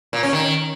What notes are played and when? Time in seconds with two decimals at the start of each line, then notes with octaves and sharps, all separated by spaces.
0.13 A#2
0.23 C#4
0.33 D#3